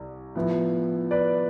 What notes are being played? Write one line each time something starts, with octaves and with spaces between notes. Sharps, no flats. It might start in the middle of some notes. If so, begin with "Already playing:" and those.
Already playing: C2
A2 F3 B3 E4
B4 D5